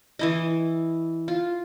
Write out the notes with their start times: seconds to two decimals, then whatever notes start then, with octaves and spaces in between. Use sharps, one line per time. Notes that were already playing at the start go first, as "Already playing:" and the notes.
0.19 E3 E4 D#5
1.28 F4